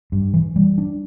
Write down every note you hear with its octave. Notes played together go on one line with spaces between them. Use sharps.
G2
E3
G3
D4